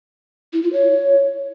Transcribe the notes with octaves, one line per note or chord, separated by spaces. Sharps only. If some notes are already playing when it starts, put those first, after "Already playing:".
E4
F4
C#5